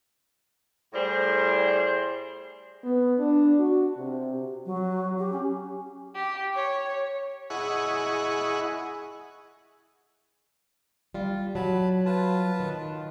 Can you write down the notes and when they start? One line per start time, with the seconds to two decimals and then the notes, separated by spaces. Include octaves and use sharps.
0.94 A2 G3 G#4 C5
2.84 B3
3.19 D4
3.59 F#4
3.98 C3
4.65 F#3
5.18 G4
5.32 C#4
6.15 G4
6.55 C#5
7.50 E4 G#4 D#5 F#5 C#6
11.14 G3 F4
11.55 F#3 A5 B5
12.06 F4 B4 A5
12.60 D#3